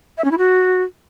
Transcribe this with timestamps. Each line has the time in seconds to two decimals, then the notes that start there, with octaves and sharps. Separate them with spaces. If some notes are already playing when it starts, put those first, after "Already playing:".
0.18 E5
0.24 C#4
0.31 E4
0.38 F#4